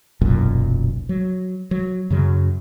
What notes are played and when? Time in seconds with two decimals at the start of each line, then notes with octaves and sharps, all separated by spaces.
0.21 E1 B1 F#2 A#2
1.09 F#3
1.71 F#3
2.10 F#2 C#3 F#3